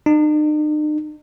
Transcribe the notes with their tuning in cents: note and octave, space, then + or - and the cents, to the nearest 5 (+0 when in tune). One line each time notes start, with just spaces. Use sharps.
D#4 -45